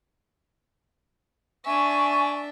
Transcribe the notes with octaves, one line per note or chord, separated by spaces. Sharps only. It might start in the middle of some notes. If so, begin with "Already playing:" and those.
D4 E5 G#5 C#6